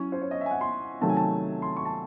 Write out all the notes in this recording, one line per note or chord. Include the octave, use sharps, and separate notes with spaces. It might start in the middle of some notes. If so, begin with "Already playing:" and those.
Already playing: F#3 C#4 E4 C#5
C5
C#5
D#5
E5
G#5
F#5
C6
C3 D#3 F#3 A3 A5
G#5
A5
C6
C#6
A5